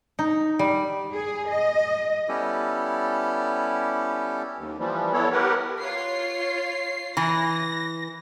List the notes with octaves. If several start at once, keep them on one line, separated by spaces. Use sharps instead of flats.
D#4
G3
G#4
D#5
G3 B3 C#4 E4 G4 A4
D#2
E3 F3 G3
B3 E4 A4 C#5
G4 A#4 B4 F#5
F4 C#5 C7
E3 A#6